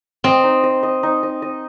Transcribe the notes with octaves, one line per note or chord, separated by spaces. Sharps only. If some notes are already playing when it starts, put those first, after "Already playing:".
C4 D#5
D#4
D#5
D#5
D#4
D#5
D#5